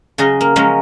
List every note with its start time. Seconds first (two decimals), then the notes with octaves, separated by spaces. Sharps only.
0.18 C#3 F#3 G#4 D#5
0.41 A#3
0.56 F3 F#3 G#3 A#3 C#4